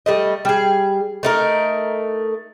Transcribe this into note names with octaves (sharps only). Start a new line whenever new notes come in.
G3 A3 D#5
G3 G#4
A3 D#4 A#4